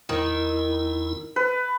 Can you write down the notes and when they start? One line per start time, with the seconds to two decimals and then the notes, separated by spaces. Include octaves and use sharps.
0.09 E2 D#3 E4
1.36 B4